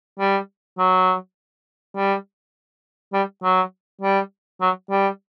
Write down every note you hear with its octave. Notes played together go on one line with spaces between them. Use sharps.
G3
F#3
G3
G3
F#3
G3
F#3
G3